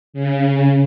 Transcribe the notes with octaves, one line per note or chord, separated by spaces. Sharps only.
C#3